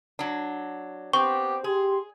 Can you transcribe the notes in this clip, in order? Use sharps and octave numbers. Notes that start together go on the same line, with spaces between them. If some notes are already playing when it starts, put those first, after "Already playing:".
F#3 D4
B3 C4 G4 C#6
G4 G#4 C6